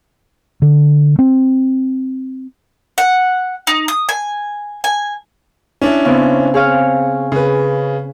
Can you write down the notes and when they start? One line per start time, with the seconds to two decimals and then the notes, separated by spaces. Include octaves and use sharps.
0.62 D3
1.19 C4
2.98 F#5
3.67 D#4
3.88 D#6
4.09 G#5
4.84 G#5
5.82 C#4 D4 E4
6.05 C#3 B3 C4
6.54 C4 G#4 C#5 F5
7.32 C#3 B4